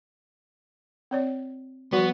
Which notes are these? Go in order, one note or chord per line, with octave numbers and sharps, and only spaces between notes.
C4 C#5 D5
F3 G3 B3 F#4